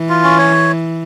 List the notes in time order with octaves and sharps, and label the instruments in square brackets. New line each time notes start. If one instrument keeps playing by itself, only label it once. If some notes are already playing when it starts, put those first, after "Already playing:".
Already playing: [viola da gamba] E3
[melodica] F4
C#4
C#5